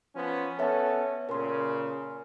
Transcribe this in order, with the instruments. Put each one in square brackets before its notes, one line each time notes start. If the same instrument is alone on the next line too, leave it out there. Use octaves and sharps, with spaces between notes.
[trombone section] F3 B3 C#4
[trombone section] B3 C#4 A4 [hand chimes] C#5 E5
[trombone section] A#2 C#3 C#4 [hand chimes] A#4 C6